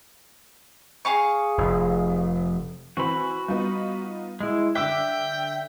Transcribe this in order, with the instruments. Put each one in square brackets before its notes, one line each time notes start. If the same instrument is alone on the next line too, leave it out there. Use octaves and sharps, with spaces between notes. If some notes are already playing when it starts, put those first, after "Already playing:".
[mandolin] G#4 F5 C#6
[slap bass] F1
[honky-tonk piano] E3 C4 [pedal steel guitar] F#4 B5
[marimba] G3 [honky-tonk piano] B3 D#4 F4
[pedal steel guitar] G#3 E4
[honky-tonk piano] D3 E6 F#6 [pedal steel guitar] E5 D6 [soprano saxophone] G5